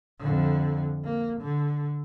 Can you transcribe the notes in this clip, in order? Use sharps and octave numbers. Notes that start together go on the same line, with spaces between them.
F2 D3
A#3
D3